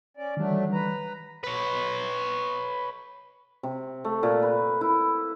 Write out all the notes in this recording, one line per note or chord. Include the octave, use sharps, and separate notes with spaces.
C#4 D5
D#3 E3 F#3 G3 A3 D4
B4 A#5
B4 C#5
C3
A3
A#2
B4
E4